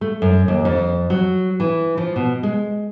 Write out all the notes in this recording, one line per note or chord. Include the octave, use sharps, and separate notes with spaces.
A3
F#2
D#2
F2
F#3
E3
F3
B2
G#3